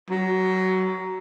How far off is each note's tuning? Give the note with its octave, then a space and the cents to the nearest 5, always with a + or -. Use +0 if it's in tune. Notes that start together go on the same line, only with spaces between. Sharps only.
F#3 +15